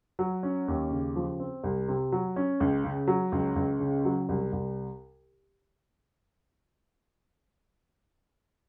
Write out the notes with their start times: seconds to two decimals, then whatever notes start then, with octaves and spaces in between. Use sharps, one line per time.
0.19 F#3
0.43 C#4
0.68 D#2
0.91 C#3
1.16 F3
1.40 C4
1.64 C2
1.88 C3
2.12 F#3
2.36 C#4
2.60 C#2
2.84 C#3
3.08 F#3
3.32 C#2
3.56 C#2
3.80 C#3
4.05 F#3
4.29 C2
4.52 C2